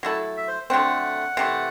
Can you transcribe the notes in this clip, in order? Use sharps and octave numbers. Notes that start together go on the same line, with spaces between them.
F#3 A3 E4 A4
E5
C5
D3 F#3 A3 C4 F#5
C3 E3 A3